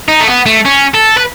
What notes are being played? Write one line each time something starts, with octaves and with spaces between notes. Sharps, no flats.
D#4
A3
B3
A3
C#4
A4
B4